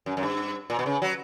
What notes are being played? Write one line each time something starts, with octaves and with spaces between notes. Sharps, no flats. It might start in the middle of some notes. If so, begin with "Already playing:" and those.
F#2
F#2
G2
A#2
B2
C#3
F#3